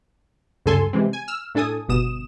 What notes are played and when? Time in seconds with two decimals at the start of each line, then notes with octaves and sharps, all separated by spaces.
0.66 D2 G2 C#3 A4 G#5 C6
0.93 C3 E3 G#3 C4
1.13 G#5
1.28 E6 F6
1.55 A2 D4 A4 G#5 D#6
1.89 G1 B2 D#6 E7